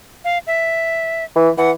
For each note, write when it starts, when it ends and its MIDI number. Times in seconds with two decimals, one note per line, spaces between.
0.24 0.38 77
0.47 1.24 76
1.36 1.49 52
1.58 1.71 52
1.58 1.71 78